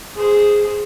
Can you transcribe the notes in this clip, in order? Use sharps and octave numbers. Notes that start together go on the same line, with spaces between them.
G#4 C5